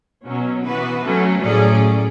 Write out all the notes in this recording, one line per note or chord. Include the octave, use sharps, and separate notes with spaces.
B2 F#3 C#4
E3 B3 F#4 B4
F#3 A3 C#4
A2 F#3 C#4 G#4 D5